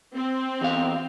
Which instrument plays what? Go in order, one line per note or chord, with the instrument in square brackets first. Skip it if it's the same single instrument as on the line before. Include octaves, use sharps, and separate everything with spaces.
[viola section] C4
[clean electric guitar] E2 F5